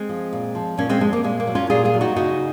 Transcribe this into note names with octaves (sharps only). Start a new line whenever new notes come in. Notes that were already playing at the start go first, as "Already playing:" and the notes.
Already playing: G#3 C4
F3
A#2
F3
A#2 A#3 C#4
G#3 C4
F3 G#3
A#3
A#2 G#3
A#3
F#3
C#4 F4
A#2 F4 G#4
F4 G#4
F#3
D#4 F#4
C#3 D#4 F#4